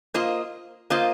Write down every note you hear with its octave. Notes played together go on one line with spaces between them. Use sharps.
A#3 F4 C5 D#5
A#3 F4 C5 D#5